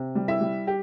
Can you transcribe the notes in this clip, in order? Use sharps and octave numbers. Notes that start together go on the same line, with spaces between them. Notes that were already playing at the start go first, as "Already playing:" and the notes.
Already playing: C3
G3
E4 E5
G3
G4